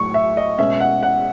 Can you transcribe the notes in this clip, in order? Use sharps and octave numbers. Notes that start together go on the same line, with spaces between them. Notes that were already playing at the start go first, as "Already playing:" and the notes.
Already playing: A2 F#3 C#6
E5
D#5
B2 G#3 C#4 E5
F#5
F#5